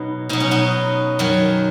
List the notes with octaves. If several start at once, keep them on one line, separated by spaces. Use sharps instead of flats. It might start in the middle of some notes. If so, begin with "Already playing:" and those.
Already playing: B2 F#3 B3 D#4
B2 F#3 D#4
C#4
B3 D#4
F#2 D#3 F#3